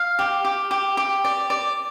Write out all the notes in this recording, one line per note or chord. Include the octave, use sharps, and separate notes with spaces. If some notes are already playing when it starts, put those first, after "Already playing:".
Already playing: F5
G4
G4
G4
G4
D5
D5